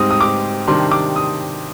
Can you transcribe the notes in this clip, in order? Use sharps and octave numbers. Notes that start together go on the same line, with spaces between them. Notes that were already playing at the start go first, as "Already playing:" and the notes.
Already playing: G#2 G3 C4 D#4 D#6
D#6
D6
C3 D#3 G3 D4 C6
D6
D#6